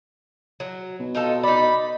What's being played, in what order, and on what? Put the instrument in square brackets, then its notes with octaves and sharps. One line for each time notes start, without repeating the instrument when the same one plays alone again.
[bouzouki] F#3
[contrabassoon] B2
[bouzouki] D#4 F4 A4
[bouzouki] D#4 D5 [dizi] B5